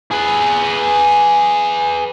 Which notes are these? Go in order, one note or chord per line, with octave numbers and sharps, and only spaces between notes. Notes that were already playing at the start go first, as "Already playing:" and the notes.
G#4 B4